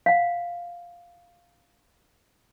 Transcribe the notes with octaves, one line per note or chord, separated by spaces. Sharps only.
F5 F#5